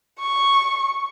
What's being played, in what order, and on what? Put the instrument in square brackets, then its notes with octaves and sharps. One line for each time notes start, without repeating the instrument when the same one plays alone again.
[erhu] C#6